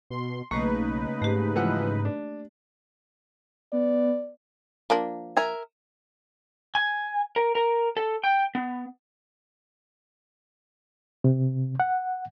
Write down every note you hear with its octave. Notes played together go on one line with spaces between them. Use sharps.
B2 C6
B1 C#3 A3 A#3 D#4 B4 C#6
G#2 A3 G4
E3 F3 F#5
D4
B3 D5
F3 A#3 D4
A#4 E5 G#5
G#5
A#4
A#4
A4
G5
B3
C3
F#5